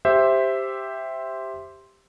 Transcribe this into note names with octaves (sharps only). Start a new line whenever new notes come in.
G4 C5 E5